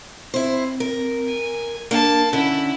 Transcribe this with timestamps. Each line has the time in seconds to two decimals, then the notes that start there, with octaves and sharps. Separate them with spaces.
0.34 C4 E4 C5
0.80 A#4
1.26 G#5
1.91 A#3 D4 A5
2.33 D3 C#4 E4